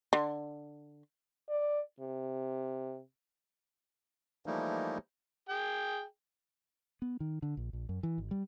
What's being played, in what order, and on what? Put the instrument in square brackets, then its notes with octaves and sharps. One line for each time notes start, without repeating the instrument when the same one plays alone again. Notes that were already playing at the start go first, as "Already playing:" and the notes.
[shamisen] D3
[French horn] D5
C3
[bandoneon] E3 F3 G3 A3 A#3 D#4
[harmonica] G#4 G5
[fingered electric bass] B3
D#3
D3
A#1
A#1
F#2
E3
G#1
G3